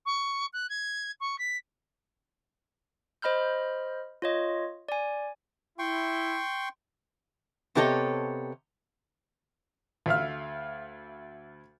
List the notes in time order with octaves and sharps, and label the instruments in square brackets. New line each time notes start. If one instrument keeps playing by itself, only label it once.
[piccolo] C#6
F#6
G#6
C#6
B6
[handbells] C5 D#5 B5 F6 G6
F4 C#5 D#5
D5 G#5
[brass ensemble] E4 [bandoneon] G5 C6 C#6
[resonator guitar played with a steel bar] C3 B3 G4 A4 C#5 D#5
[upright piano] D2 E5 F5 F6